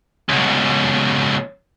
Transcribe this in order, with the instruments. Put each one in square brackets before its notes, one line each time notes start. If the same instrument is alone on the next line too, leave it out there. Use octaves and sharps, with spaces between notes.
[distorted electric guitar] C#2 B2